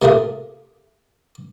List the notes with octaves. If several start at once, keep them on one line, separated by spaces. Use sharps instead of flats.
C3 A3 A#3 F4 G#4